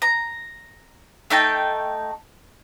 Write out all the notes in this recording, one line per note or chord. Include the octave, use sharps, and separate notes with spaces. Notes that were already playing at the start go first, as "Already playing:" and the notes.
A#5
A3 D#4 G5 A5